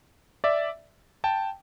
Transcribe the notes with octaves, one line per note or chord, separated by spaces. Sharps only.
D5 E5
G5 A5